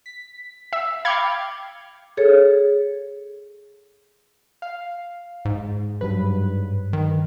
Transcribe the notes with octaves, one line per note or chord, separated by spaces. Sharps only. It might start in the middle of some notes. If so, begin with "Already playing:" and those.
B6
E5
F5 G5 B5 D6 G#6 C#7
G#4 A4 C#5
F5
G#2
G2 F#3 B4
D#3